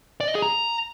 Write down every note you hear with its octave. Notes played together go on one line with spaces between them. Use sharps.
D5
D#5
G#4
A#5